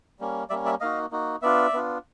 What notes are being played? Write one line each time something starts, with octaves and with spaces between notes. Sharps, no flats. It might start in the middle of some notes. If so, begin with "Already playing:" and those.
G3 A#3 C#4
G3 A#3 C#4 D5 E5
D5 E5
A#3 D#4 F#4 D#5 F5
A#3 D#4 F#4
B3 D4 F4 D5 E5
B3 D4 F4